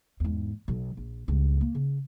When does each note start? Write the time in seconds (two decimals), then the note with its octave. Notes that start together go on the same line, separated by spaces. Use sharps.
0.20 E2 G#2
0.68 B1 F#3
0.97 A#1
1.28 C#2 G2
1.61 A#3
1.75 C#3